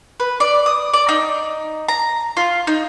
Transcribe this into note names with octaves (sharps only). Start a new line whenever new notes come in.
B4
D5
D#6
D5
D#4
A#5
F4
D#4